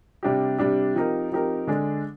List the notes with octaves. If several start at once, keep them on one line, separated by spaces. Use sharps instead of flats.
C3 G3 D4 G4
C3 G3 D4 G4
F3 C4 D#4 G4 A#4
F3 C4 D#4 G4 A#4
D3 G#3 D4